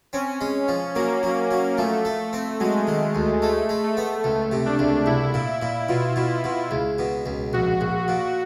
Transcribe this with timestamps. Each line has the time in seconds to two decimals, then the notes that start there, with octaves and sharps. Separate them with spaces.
0.13 C4 C#4
0.41 G#3
0.68 F3
0.95 F#3 A#3
1.23 F#3
1.51 F#3
1.78 F3 A3
2.05 A3
2.33 C4
2.60 F#3 G#3
2.87 D#3
3.15 D2
3.42 G#3 A3
3.69 G#3
3.84 A3
3.97 B3
4.24 C#2 A3
4.52 C3
4.66 D4
4.79 C#2
5.06 C2 E4
5.34 A#2
5.62 A#2
5.89 B2 F4
6.16 B2
6.44 B2
6.71 C#2
6.99 B2
7.26 C#2
7.53 A#1 F#4
7.81 A#1
8.08 A#2